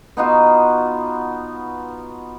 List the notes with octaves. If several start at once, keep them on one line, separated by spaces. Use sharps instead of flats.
B3 D#4 F4 F#4